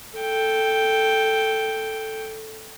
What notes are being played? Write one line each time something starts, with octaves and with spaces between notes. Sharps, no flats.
A4 G5